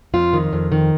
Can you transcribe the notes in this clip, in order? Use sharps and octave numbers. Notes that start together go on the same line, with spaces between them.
F2 F4
D#3
F2
D#3